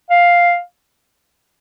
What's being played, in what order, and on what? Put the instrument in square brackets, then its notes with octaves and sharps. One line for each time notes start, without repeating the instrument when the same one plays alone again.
[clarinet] F5